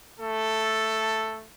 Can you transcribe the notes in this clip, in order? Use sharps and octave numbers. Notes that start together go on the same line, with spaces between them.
A3 A4